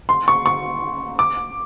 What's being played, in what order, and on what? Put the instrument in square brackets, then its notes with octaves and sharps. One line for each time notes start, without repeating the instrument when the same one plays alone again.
[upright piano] C6
C#6
C#6
D6